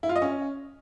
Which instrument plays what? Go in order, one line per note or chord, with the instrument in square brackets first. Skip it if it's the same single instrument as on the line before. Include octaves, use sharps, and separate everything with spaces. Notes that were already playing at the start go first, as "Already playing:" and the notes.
[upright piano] E4
F4
D#5
C#4